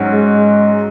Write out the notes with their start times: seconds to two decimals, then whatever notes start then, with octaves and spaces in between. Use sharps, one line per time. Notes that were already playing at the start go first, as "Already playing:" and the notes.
Already playing: G#2 F#3 C#4 F#4
0.12 G#3